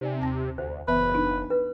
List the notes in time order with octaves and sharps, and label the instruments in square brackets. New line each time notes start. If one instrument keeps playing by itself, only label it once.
[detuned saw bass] C3 [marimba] D#4 D5 G#5
[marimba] D#2 A5 A#6
[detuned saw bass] D2 [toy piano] C5
[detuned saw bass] F#1 [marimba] E3 B3 E5 [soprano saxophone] B4
[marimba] D4 D#4
[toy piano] B4